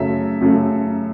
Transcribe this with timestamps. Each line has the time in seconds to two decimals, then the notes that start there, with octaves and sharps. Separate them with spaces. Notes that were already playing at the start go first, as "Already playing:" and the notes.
Already playing: F#2 C#3 F#3 A3 E5
0.41 F#2 C#3 F#3 A3